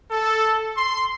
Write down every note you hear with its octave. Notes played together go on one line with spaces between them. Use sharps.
A4
C6